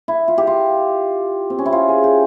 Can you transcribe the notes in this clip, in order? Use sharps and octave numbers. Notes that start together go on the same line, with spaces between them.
E4
F4
G4
F4
C4
C#4
E4
F4
G#4
G4